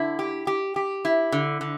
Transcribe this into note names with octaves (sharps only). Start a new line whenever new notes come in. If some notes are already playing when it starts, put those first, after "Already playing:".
Already playing: D3 E4
G4
G4
G4
E4
D3
D3